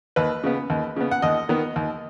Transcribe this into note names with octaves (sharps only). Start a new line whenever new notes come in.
D#2 B4
C#3 B3
D#2
C#3 B3
F#5
D#2 D#5
D#3 B3
D#2